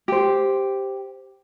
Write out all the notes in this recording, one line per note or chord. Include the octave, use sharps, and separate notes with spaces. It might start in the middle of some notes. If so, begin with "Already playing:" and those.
G4 C5